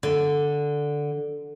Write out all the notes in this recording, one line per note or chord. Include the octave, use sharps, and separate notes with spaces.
D3